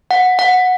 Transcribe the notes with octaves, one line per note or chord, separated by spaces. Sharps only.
F#5
F#5